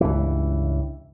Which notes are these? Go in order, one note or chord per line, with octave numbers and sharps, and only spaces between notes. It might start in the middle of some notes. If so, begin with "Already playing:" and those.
C#2 G2 E3